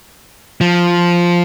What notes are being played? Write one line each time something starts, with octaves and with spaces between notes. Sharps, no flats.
F3